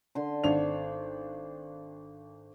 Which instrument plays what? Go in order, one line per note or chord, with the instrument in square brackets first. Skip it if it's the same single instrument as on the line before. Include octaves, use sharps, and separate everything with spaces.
[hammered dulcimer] D3 C6
[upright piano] G#1 D4 F7 [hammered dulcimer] C5 C#6